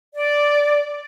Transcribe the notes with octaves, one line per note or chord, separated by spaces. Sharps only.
D5